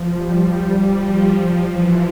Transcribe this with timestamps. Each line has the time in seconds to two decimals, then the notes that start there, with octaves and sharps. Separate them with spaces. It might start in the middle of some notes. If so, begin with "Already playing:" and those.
Already playing: F3
0.15 G3
0.93 F3
1.71 E3